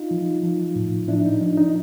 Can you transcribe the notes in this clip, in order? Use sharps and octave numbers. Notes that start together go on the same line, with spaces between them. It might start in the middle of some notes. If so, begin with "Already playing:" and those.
Already playing: D#4 F4
F3
F3
A2
F3 D4 E4
D#4
F3 D4
D#4